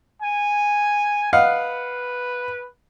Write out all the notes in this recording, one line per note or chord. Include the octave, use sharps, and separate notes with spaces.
G#5
B4 D#5 F5 F#5